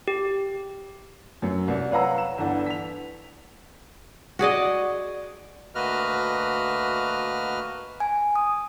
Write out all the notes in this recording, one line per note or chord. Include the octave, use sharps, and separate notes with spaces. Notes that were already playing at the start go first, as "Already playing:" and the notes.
G4
F#2 F#3
C2 D5
B4 C#5 F5 F#5 A#5 E6
E7
G1 E3 D4 F#5
B6 F7
F#4 G#4 D5 D#5
D2 A#3 F#4 B4 D#5 F6
G#5
D#6